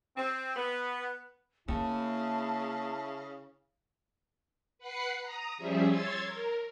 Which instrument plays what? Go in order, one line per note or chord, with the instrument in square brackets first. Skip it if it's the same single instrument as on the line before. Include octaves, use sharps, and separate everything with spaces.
[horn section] C4
B3
[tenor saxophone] C#3 [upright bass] A#3 [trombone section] E4 [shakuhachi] A5
[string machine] B4 F#5 B5 F#6 C7 C#7
A#5 D#6
F3 G3 C#4 G#4 E5
C#5 C6 E6 G#6 A6
A#4